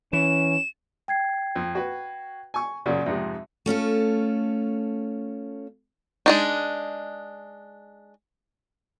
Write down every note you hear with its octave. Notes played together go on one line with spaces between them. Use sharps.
E3 C#4 E7
G5 G#6 C7
F2
F#4 B4
G#5 C#6
F#2 A#2 C#3 D5
F2 G#2 C3 E5
A3 C#4 F4 A4
G#3 D4 D#4